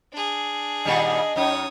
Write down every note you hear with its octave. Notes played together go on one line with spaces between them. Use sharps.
D4 G#4
A#2 D#3 G3 D#5
F#2 D#4 C#5 D#6